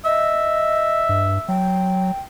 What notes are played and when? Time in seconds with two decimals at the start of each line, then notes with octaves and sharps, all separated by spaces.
0.05 D#5 E5
1.09 G2
1.48 F#3 G5